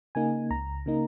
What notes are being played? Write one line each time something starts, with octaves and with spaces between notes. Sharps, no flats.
C#3 A#3 D#4 G#5
C#2 A#5
C#3 A#3 D#4